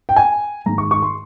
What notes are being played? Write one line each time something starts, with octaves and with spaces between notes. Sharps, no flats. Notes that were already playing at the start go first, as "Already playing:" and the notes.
G5
G#5
G#2 D#3 A#5
C#6
C#6
C6